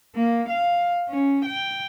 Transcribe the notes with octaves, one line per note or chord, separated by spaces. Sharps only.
A#3
F5
C#4
G5